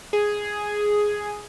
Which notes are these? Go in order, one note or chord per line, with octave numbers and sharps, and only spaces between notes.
G#4